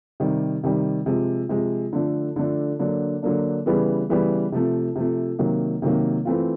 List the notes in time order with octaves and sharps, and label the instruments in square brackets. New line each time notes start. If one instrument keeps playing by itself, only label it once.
[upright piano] C3 D#3 G3
C3 D#3 G3
C3 F3 G#3
C3 F3 G#3
D3 F3 A3 D4
D3 F3 A3 D4
D3 F#3 A#3 D4
D3 F#3 A#3 D4
C#3 E3 G3 B3
C#3 E3 G3 B3
C3 F3 A3
C3 F3 A3
C3 D#3 F#3 A#3
C3 D#3 F#3 A#3
E3 A3 C4 F4